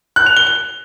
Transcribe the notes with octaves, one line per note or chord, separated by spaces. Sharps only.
F#6
F7
G7
G7